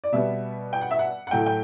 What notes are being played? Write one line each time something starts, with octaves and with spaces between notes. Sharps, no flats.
D5
B2 G3 B3 E5
G5
F#5
E5
F#5
F#5
A2 F#3 A3 G5
G5